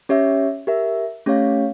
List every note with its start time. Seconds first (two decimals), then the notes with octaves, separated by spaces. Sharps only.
0.09 C#4 G4 C#5 E5
0.67 G4 A#4 E5
1.26 A3 C#4 G4 C#5 F5